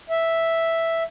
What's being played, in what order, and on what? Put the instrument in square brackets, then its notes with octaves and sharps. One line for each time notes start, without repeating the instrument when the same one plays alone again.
[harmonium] E5